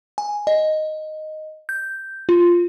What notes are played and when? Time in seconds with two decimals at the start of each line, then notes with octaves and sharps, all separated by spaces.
0.18 G#5
0.47 D#5
1.69 G6
2.29 F4